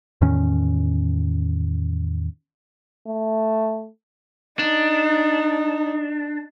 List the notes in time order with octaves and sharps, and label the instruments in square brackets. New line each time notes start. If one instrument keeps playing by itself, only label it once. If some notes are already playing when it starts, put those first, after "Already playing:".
[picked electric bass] E2 A2 D#3 C#4
[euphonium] A3
[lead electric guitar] D4 [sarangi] D#4